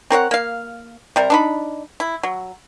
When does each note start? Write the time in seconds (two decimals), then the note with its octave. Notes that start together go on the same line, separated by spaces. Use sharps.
0.10 C4 A#4 C#5 F#5
0.31 A#3 F5
1.16 C3 G3 A#4
1.30 D4 D#4 B5
2.00 E4
2.23 F#3